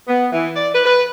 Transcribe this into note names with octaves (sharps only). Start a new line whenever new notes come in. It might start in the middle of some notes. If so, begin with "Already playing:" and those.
B3
E3
D5
B4
B4